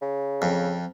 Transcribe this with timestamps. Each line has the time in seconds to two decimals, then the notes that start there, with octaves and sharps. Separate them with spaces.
0.02 C#3
0.42 F2